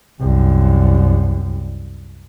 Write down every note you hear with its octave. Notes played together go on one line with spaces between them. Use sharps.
C2 F#2